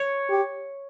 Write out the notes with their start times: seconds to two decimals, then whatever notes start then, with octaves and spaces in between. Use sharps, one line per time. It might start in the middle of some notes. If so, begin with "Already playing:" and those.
Already playing: C#5
0.30 G4